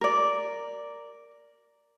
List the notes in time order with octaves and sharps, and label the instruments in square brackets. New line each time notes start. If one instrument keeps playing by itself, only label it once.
[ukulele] A#4 D5